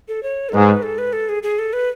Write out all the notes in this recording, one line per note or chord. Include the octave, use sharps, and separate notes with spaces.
A4
C#5
A4
G#2 B4
A4
B4
A4
G#4
G#4
A4
B4